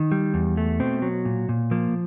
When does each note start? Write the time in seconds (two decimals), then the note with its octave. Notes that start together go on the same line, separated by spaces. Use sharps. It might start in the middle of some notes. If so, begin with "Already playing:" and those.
Already playing: D#3
0.12 G3
0.34 E2
0.57 A3
0.80 B2 C4
1.02 F#3
1.25 A#2
1.49 A#2
1.71 F3 A#3